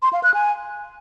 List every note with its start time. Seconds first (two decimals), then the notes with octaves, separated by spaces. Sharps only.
0.02 C6
0.13 F5
0.23 F#6
0.34 G#5